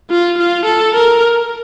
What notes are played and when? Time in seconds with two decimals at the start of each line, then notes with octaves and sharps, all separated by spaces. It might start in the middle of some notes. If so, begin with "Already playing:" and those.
0.10 F4
0.38 F4
0.65 A4
0.94 A#4